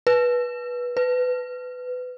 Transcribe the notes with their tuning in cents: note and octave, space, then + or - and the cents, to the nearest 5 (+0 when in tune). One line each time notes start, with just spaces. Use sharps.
B4 -15
B4 +20